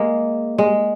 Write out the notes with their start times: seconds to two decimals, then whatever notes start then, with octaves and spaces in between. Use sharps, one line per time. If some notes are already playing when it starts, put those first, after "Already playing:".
Already playing: G#3 A#3
0.58 G#3